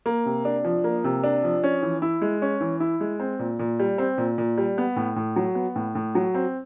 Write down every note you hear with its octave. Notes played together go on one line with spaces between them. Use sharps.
A#3
C3
D4
F3
A#3
C3
D4
F3
C#4
E3
E4
G#3
C#4
E3
E4
G#3
C4
A#2
A#2
G3
C4
A#2
A#2
G3
B3
A2
A2
F#3
B3
A2
A2
F#3
C4